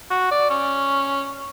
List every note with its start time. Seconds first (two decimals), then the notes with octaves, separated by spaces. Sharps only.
0.11 F#4
0.31 D5
0.50 C#4